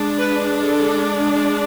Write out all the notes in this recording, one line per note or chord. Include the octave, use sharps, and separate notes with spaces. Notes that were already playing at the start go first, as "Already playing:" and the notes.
Already playing: G#3 D4
B4
A4